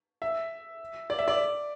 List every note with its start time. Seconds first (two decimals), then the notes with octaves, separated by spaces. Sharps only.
0.22 E5
1.10 D5
1.19 E5
1.28 D5